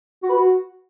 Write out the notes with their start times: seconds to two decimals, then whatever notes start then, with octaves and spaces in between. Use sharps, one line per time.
0.23 F#4
0.30 B4
0.36 F#4